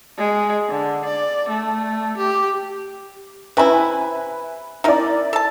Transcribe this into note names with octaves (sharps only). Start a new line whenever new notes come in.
G#3
D3
D5
A3
G4
C3 E4 B4 G#5 B5
D#4 E4 A#4 D5
A4 A5